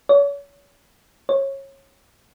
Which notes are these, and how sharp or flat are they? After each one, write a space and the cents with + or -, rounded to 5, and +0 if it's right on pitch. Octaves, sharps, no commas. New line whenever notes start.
C#5 +35
C#5 -25